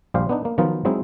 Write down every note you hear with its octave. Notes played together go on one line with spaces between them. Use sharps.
A#1 G3 G4 C5 F5
B3 D4 D#4
A#3
D#3 F3 F#3 B3 D#4 F4
F#3 G#3 C4 D#4 E4